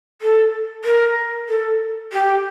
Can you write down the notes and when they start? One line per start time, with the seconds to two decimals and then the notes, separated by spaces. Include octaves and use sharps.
0.21 A4
0.84 A#4
1.49 A4
2.12 G4